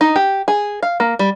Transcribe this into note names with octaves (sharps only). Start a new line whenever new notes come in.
D#4
G4
G#4
F5
A#3
G3